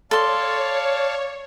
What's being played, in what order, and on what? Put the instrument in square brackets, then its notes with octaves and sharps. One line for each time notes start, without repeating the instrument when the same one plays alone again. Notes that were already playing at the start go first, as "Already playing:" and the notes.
[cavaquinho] A4 C6 [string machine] C#5 [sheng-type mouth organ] D5 F5 A5